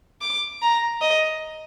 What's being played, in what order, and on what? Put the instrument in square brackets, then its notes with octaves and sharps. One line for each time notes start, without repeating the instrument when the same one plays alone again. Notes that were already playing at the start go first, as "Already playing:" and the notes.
[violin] D6
A#5
D#5